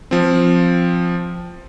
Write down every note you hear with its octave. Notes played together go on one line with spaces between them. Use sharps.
F3 C4